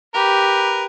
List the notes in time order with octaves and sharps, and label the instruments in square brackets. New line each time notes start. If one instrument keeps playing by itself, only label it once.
[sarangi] G4 [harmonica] A#4 B4